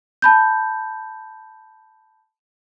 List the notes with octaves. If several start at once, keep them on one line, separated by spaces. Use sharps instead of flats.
A5 B5 G6